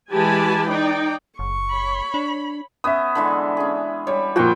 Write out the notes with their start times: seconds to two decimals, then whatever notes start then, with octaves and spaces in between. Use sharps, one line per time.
0.13 E3 G#3 G4 G#5 A5 B5
0.67 D#4 D5 G5
1.39 F#1 C#6
1.72 C#5 B5
2.14 D4
2.84 B3 C#4 E5 D#6
3.15 D3 E3 G#3
3.57 C#4 G#4
4.07 G3 C#5
4.36 A#2 F3 F#4 G5